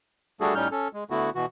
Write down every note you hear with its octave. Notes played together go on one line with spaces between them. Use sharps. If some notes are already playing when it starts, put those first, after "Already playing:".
G3 A3 D4 F#4 G#4 A4
A2 G3 C#4 D#4 F6 G6
C#4 A4
G#3
D3 A3 B3 E4 F#4
B2 E3 F#4